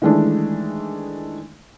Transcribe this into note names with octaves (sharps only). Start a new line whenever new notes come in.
D#3 E3 G#3 A3 D4